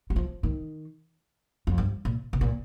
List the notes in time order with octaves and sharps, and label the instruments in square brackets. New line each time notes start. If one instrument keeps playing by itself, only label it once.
[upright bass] G3
F3
D#3
F2
G2
A#2
C3
A#2